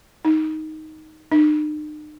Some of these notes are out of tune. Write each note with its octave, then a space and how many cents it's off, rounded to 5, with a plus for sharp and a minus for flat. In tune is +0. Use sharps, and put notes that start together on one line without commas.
D#4 +10
D#4 -45